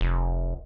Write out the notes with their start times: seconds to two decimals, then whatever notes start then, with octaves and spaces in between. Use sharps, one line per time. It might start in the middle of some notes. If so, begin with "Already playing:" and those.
0.01 F1